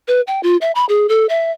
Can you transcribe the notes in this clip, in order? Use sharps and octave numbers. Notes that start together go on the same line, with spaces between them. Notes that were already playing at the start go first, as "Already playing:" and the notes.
B4
G5
F4
E5
B5
G#4
A4
E5